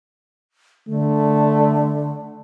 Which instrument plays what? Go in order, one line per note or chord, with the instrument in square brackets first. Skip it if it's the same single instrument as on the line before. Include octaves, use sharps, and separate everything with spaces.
[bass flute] D3 [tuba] A3